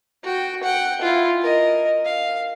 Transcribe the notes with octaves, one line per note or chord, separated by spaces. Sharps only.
F#4 G5
F#5 G5
E4 F4
A#4 D#5
F5